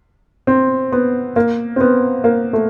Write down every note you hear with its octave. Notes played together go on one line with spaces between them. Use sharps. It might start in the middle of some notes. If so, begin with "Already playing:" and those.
C4
B3
A#3
C4
B3
A#3
A3